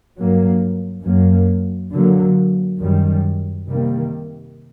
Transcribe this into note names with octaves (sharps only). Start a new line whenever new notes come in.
G2 F#3 A#3
F#2 F#3 A#3
D3 F#3 A#3
F#2 D#3 G3
C3 D#3 G3 A#3